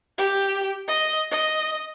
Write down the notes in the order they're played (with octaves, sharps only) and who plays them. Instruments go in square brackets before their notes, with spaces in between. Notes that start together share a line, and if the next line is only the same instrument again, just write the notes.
[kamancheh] G4
D#5
D#5